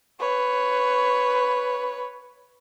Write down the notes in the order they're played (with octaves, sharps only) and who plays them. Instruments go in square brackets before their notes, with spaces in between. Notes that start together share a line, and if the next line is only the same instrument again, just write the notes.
[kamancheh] B4 C#5